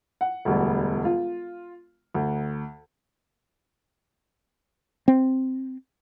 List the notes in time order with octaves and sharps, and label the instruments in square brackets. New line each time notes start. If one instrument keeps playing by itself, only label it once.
[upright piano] F#5
E1 D2 G3
F4
D2
[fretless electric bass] C4